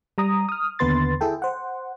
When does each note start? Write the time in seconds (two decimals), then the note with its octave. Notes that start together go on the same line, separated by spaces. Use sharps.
0.18 G3 A#5 D#6
0.49 D#6 F6
0.79 D#2 D3 B3 B4 C6 A6
1.21 E4 G#4 A4 G5
1.42 C5 F#5